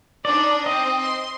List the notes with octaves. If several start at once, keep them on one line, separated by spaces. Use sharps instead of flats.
D4 D#4 D5
C4 D#5
C6